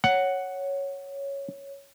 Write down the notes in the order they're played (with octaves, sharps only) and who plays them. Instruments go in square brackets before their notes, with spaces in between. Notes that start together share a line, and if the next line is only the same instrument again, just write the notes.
[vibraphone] C#5 [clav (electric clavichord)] F#5